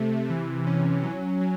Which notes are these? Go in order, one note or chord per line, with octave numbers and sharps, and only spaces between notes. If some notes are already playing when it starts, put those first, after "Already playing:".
Already playing: C3 A3
E3
C#4
F#3
F#3